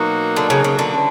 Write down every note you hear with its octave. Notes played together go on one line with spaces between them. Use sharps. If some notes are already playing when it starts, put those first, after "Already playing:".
Already playing: B2 F#3 A#3 D#4 F#4
D3
C#3
C#3
D3
C#3 E3 G3